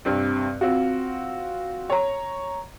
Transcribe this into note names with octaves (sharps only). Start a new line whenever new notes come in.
G2 C3 C4
C4 F4 F#4
C#5 A#5